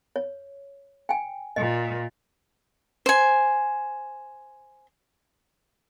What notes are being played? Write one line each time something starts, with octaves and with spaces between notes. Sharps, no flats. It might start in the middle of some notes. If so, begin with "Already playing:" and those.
C#5
G5 G#5
A#2 D#5
C5 G#5